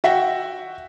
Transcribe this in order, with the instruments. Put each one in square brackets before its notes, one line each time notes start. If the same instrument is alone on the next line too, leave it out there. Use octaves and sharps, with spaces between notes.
[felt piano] F#4 E5 F#5 G5